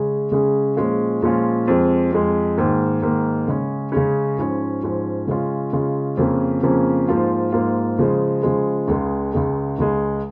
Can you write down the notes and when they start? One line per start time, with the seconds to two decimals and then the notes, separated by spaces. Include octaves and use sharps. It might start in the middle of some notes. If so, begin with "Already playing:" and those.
Already playing: C#3 G#3 C#4 G#4
0.32 C#3 G#3 C#4 G#4
0.76 A#2 F3 G#3 C#4 F4
1.22 A#2 F3 G#3 C#4 F4
1.68 F2 F3 G#3
2.12 F2 F3 G#3
2.57 G#2 D#3 A#3
3.02 G#2 D#3 A#3
3.47 C#3 G#3 C#4
3.92 C#3 G#3 C#4
4.38 G#2 F3 C#4
4.83 G#2 F3 C#4
5.27 C#3 G#3 C#4 F4
5.73 C#3 G#3 C#4 F4
6.17 F2 C#3 F3 A#3 C#4
6.63 F2 C#3 F3 A#3 C#4
7.08 G#2 F3 A#3 F4
7.52 G#2 F3 A#3 F4
7.98 C#3 F3 G#3
8.43 C#3 F3 G#3
8.88 C#2 C#3 G#3
9.33 C#2 C#3 G#3
9.78 C#2 C#3 G#3